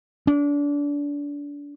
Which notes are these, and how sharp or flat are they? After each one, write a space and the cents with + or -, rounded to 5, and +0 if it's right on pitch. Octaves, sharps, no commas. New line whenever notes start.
D4 -30